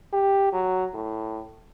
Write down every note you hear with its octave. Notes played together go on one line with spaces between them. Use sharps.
G4
F#3
A2